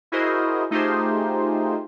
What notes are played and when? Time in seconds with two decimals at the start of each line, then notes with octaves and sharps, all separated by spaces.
0.12 E4 F#4 G#4 A#4 C5 D#5
0.71 A3 D#4 F4 G4 G#4 C5